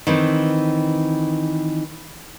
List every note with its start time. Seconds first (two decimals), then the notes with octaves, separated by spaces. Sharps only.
0.07 D#3 E3 C4